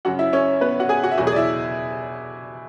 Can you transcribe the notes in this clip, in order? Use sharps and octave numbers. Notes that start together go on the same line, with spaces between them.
F#2 C#3 F#3 F#4 F#5
E4 E5
C#4 C#5
B3 B4
F#4 F#5
G#4 G#5
F#4 F#5
E5
E2 B2 F#3 F#4 F#5
G#4 G#5
D5
E4 E5